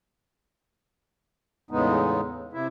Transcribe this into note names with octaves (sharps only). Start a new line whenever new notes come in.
E2 A2 C#3 G#3 B3 D#4
C3 E4